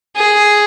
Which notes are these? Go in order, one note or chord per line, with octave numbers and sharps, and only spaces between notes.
G#4